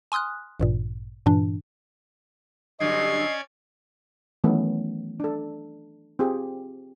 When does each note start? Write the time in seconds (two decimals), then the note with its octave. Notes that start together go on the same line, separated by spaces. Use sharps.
0.12 G#5 C6 D#6 F6 F#6
0.60 A1 G2 A#2
1.26 G2 A#2 E3 D4
2.80 G2 D3 F#3 C#4 D5 D#5 G#6 C7
4.44 D#3 E3 F#3 A3 B3 C#4
5.20 D4 A4
6.19 C4 F4 G4 G#4